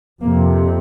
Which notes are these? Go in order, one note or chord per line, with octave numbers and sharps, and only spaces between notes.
F2 C3 A#3